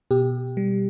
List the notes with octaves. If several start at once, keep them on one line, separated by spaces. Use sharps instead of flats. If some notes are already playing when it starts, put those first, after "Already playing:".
B2 G4
G3